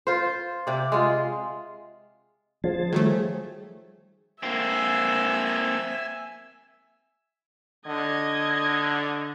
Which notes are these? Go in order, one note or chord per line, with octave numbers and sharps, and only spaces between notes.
F4 C5
C3 D5
G#3 F4
F3 G#4 C5 A5
D#3 F#3 G3 A3 G#4
A#3 C4 E5 G#5
D3 D#5 G#6